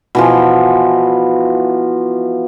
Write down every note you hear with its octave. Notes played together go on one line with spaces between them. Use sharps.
B2 E3 F3